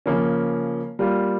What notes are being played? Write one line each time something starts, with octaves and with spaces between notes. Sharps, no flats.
C#3 F3 A#3 C#4
G3 A#3 F4